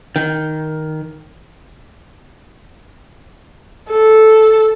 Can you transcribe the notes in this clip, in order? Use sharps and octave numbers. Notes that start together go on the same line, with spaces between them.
D#3
A4